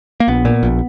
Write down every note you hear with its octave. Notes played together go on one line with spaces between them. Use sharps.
A#3
A#1 B3
A#2
A#1